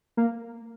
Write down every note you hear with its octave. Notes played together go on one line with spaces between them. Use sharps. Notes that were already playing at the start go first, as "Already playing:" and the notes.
A#3